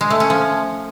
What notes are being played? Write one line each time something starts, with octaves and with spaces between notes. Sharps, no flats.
G#3
A3
C#4
F3